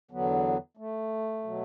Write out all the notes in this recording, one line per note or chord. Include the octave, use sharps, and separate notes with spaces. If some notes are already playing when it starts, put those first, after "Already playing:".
E2 D3 F#3 B3
A3
B2 F#3